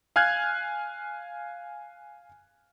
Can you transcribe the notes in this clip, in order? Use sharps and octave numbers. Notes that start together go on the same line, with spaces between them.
F5 G#5 F6 F#6 G#6